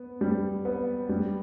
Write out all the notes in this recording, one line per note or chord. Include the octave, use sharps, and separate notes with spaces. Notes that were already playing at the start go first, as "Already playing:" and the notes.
Already playing: B3
G3
B3
G3